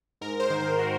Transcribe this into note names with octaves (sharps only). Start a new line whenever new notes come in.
G#2 A#4
C5
D#3
A#4
F#4